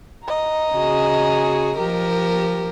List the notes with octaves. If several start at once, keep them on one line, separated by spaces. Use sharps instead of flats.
D#5 A#5
C#3 F#4 G#4
F3 G4 A#4